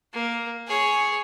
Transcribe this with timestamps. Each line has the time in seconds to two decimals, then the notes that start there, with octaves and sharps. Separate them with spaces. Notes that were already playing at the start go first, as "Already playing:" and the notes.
0.13 A#3
0.68 G#4 C#5